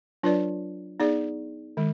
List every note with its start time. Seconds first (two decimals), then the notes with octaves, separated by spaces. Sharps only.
0.23 F#3 D4 F4 B4 D5
1.00 B3 D#4 G#4 D5
1.77 D#3 G#3